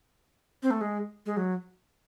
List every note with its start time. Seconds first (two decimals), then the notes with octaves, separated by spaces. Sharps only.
0.63 C4
0.71 A3
0.81 G#3
1.26 G#3
1.37 F#3